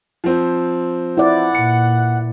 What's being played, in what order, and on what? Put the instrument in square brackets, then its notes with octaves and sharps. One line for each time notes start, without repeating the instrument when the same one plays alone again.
[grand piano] F3 C4
[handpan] E4 B4 D5 [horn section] F#5
[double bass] A#2 [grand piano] C#7